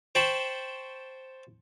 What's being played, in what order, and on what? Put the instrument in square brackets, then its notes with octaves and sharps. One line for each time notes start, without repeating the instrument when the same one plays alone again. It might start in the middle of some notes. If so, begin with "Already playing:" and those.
[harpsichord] C5 G5 A5 B5 C#6